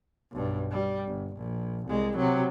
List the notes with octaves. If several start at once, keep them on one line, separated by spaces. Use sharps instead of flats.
B1 G2
G3
G1
A#1
C2 G#3
C3 F#3